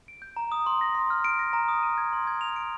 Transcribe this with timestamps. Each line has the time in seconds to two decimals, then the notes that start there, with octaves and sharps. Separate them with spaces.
0.08 D7
0.22 G6
0.37 A#5
0.52 D#6
0.66 C6
0.81 A#6
0.95 C6
1.10 F6
1.24 D7
1.39 A#6
1.53 A#5
1.68 D#6
1.83 D#7
1.98 G#6
2.13 C6
2.27 G#6
2.41 F7
2.56 D7